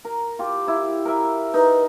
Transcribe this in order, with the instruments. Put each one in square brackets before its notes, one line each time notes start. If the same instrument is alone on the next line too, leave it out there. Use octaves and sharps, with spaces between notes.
[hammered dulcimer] A#4
F4 G4
E4 D6
A#4 E5
[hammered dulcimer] D#4 [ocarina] B4